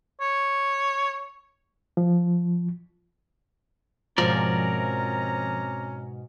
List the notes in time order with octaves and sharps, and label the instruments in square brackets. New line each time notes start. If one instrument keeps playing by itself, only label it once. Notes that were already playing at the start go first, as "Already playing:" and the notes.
[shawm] C#5
[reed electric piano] F3
[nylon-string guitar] G#2 B2 [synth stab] F3 [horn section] C4 C#4 A#5 [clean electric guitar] A#4 D5